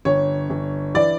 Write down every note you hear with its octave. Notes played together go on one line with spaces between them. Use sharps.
G1 C#5
G1
E3 D5